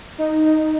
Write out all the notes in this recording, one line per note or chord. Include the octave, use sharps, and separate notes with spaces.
D#4
D#4